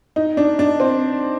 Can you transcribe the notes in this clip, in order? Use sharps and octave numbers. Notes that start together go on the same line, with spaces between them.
D#4
D4
D4
C4